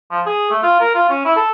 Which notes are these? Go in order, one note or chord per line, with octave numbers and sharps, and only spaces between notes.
F3
G#4
A3
F4
A#4
F4
C#4
E4
A4